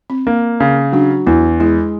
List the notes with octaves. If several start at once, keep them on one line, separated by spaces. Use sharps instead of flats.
C4
A#3
C#3
F#3 D4
E2 E4
G#3 E4